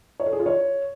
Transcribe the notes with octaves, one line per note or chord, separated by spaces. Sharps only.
C#5
A4
G#4
F4
C#5